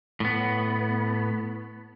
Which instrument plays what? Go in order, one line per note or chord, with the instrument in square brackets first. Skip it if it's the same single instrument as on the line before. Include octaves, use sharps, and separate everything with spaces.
[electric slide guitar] A2 B3